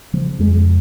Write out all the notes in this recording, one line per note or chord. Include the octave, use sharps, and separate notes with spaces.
C#3 F3
F2 G#3